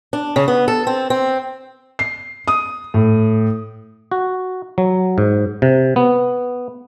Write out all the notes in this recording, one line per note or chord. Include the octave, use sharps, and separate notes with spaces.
D4
C#3
B3
A4
C4
C4
C7
D#6
A2
F#4
F#3
G#2
C3
B3